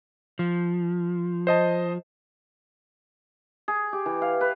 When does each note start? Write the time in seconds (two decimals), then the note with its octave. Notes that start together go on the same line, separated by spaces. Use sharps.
0.39 F3
1.47 C5 D#5 A5
3.68 G#4
3.93 G4
4.06 E3
4.22 F5
4.41 B4